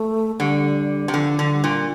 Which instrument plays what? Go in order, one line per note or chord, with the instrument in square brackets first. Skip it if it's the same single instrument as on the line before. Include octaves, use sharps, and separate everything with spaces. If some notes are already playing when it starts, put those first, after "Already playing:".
Already playing: [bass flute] A3
[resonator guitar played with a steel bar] D3 [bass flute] G3
[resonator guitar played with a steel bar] C3
[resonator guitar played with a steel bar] D3 [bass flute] F3
[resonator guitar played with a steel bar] D3 [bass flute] F3
[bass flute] G3
[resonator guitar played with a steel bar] A#2